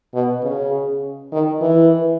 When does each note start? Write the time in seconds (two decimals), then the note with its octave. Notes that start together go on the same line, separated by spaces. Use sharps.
0.14 B2
0.43 C#3
1.32 D#3
1.61 E3